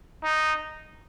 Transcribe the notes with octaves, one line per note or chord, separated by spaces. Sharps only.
D#4